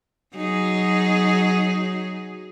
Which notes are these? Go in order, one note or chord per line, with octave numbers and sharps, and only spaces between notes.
F#3 D#4 G#4